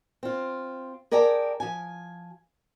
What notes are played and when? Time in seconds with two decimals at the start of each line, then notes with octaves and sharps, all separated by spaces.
0.23 C4 F4
1.11 G#4 A#4 D5 G5 A5 A#5
1.60 F3 G#5